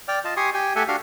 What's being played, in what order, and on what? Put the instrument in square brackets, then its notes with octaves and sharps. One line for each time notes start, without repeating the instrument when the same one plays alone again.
[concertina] D5 G5 F6
F4 D#5 A5
G4 G#5 C6 C#6 D#6
G4 G5 G#5
A3 G4 A4 E5 F#5 G#5
D4 F#4 G4 F5